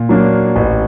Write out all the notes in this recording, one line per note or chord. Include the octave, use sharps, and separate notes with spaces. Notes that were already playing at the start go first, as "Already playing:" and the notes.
Already playing: A#2
F#3 A#3 D4
A1